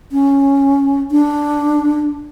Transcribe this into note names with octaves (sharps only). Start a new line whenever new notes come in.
C#4
D4